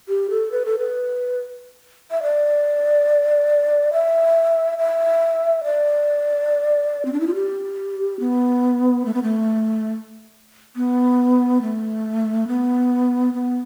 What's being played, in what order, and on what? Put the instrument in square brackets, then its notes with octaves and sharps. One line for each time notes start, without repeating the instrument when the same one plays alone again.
[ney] G4
A4
B4
A4
B4
E5
D5
E5
E5
D5
C4
D4
E4
F4
G4
B3
A3
B3
A3
B3
A3
B3
B3